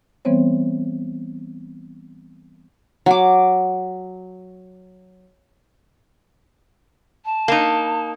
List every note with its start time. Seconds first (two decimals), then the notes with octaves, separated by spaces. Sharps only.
0.25 E3 G3 B3 C4 C5 C#5
3.06 F#3 D6
7.25 A5
7.48 A#3 D#4